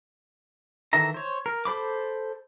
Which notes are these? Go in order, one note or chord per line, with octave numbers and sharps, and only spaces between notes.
D#3 E3 A4 E5 A#5
C5 C#5
A#4
A4 C5 B5 D6